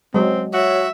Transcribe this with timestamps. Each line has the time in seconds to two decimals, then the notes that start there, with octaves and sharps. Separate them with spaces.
0.14 F#3 G#3 C4
0.54 F#4 C#5 E5